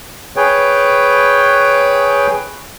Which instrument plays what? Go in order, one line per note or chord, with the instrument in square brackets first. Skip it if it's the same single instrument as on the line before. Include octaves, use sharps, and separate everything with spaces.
[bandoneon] G#4 B4 C#5 G5